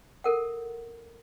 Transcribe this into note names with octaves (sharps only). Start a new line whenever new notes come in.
A4 A#4 F#5